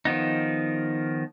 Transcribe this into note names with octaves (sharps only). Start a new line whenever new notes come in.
D#3 F3 B3 D#4